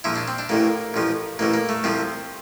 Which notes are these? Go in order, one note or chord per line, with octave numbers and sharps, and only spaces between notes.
A#1 A#2 F3 E4
D4
C4
D4
A1 A2 E3 A#3
A1 A2 F3
A1 A2 E3 A#3
A#3
A3
C2 C3 F3 C4